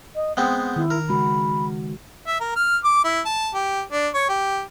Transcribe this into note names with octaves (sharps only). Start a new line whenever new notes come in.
D#5
G#3 B3 C4 F#5
D#3 E4
A#4
C#3 G#3 F#4 B5
E5
A#4
F6
D6
E4
A5
G4
D4
C#5
G4